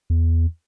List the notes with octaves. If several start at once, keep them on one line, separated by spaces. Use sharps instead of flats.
E2